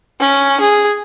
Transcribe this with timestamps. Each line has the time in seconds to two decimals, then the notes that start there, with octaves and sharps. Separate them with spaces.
0.20 C#4
0.61 G#4